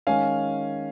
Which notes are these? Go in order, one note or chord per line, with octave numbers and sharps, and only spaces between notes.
D#3 G#3 C#4 F5 G#5